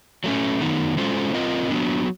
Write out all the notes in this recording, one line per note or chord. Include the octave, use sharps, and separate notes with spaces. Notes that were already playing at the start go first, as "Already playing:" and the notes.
F#3 A3 C#4
D#3 F#3 B3 D#4
G#3 C#4 F4 A4 C5
C4 F4 A#4 D#5
F#3 B3 D4